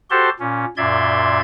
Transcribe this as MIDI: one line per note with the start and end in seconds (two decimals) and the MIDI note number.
0.10 0.29 66
0.10 0.29 67
0.10 0.29 69
0.10 0.29 72
0.10 0.29 81
0.10 0.29 84
0.40 0.65 46
0.40 0.65 61
0.77 1.41 42
0.77 1.41 46
0.77 1.41 74
0.77 1.41 76
0.77 1.41 84
0.77 1.41 92